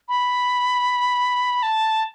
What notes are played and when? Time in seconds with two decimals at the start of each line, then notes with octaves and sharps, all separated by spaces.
0.09 B5
1.63 A5